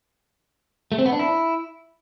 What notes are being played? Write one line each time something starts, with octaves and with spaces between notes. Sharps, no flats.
A3
C4
B3
D4
E4